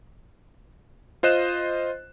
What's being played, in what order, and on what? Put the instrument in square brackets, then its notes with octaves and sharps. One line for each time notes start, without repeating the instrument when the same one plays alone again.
[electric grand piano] F4 C5 D#5 F#6 E7